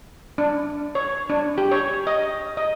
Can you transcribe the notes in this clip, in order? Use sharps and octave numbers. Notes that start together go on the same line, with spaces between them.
D4
C#5
D4
G4
C#5
D#5
D#5